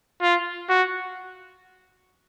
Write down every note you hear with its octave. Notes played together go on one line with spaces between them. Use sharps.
F4
F#4